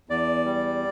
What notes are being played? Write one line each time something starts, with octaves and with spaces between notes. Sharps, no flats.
E2 D5
G3